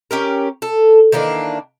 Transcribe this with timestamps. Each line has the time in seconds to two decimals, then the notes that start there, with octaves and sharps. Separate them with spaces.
0.11 C#4 G4 A#4
0.62 A4
1.12 D#3 E3 A#3 D4